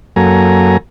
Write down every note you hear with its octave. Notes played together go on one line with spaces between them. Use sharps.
F#2 F#3 A#3 A4 G#5 A#5